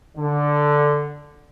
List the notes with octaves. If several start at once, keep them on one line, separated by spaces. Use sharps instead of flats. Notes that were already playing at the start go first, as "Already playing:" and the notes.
D3